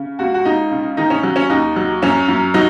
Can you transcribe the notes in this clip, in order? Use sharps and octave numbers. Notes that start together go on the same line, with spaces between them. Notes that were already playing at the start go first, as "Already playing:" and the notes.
Already playing: C#3
C#2 F#4
F#4
C#2 D#4
C#3
D#3 D#4
C#4
F#3
C#4
D#2 D#4
F#3
F#2 C#4
F#2
F#3 D#4